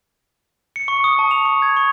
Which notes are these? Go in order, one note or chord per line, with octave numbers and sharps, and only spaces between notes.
C#7
C#6
D#6
A5
F7
C#6
G#6
C#6